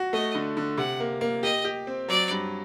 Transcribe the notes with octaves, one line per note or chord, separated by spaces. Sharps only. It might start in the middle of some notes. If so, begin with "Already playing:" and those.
Already playing: F#4
A3 D#5
D3
D3
C3 F#5
A#3
A#3
G4 D#5
G4
C4
F#3 D5
G2